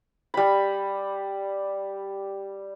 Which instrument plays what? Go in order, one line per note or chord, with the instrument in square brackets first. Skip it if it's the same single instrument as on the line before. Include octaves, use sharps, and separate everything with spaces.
[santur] G3 B5